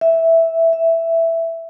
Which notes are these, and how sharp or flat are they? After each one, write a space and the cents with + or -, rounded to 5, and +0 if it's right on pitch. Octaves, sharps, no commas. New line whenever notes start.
E5 -5
E5 +5